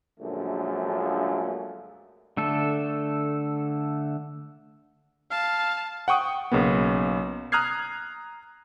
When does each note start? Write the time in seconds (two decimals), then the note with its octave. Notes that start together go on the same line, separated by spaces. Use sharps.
0.20 A#1 F#2 D3 F3 G#3 A3
2.37 D3 A3 A4
5.31 F5 A5
6.08 F#5 G5 C#6 D#6
6.52 B1 C#3 A#3 B3
7.52 A#5 D#6 F6 F#6 G#6 C7